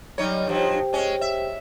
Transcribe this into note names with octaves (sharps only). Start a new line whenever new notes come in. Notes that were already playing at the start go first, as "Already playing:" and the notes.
F#3 G3 D#4 C#5 D#5
G2 F3 F#3 G4 C5 G5
G#3 C#4
E5